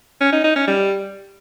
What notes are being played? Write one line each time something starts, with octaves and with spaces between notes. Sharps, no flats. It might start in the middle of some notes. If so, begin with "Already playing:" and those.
C#4
D#4
D#4
C#4
G3